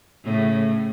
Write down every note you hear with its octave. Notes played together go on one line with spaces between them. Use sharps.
A2 C#3 A3